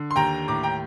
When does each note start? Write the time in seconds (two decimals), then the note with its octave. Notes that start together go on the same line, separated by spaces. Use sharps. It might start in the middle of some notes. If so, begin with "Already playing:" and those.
Already playing: D3
0.11 C6
0.16 D#2 G5 A#5
0.48 A2 A#5 D6
0.63 G5 A#5